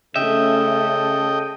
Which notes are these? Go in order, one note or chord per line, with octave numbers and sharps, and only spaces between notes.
C#3 A3 C#4 A4 D#5 E5 G5